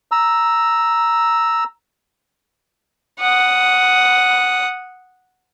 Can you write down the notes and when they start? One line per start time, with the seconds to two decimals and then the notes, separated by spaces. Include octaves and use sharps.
0.12 A#5 E6
3.20 F#5 D#6